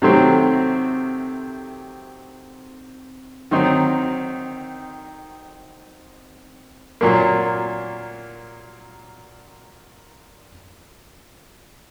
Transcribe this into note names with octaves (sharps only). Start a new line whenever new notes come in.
C3 D#3 F#3 A3 C4
D#3 F#3 C4 D#4
A#2 F#3 A#3